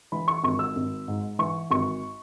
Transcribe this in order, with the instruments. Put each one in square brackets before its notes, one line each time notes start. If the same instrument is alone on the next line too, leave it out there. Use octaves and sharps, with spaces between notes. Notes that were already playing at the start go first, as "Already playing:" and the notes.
[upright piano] E3 B5
C#6
G#1 C#6
E6
G#1
G#2
E3 C#6
G#1 C#6